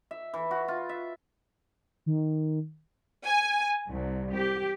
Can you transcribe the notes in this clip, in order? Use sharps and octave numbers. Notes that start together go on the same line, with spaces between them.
E5
E3
F#4
F4
E5
D#3
G#5
C2
G4